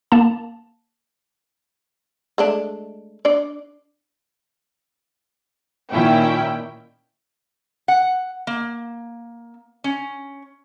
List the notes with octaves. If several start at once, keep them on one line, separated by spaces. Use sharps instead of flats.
A#3 A5
G#3 A3 D4
D4 D5
A#2 D#3 C#4 E4 G5
F#5
A#3
C#4